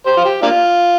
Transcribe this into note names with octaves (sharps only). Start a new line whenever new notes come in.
G4 C5
F4
G4
A#3 D4 F4